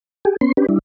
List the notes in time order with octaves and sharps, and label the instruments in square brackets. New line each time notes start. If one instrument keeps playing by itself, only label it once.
[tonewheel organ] G4 G#4
B3 C#4 C6
C#4 D4 G4 B4
G3 D4 E4